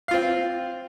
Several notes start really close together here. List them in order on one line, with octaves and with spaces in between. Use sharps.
F5 F4 C4